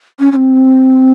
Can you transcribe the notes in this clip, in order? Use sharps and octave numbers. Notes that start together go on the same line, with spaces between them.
C#4
C#4
C4